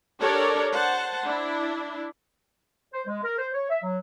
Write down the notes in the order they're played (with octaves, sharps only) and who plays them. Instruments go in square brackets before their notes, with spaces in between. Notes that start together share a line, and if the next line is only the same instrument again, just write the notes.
[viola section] D4 G4 A4 A#4 C#5 D5
C5 F#5 A5
D4 E4
[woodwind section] C5
G#3
A#4
C5
C#5
E5
F#3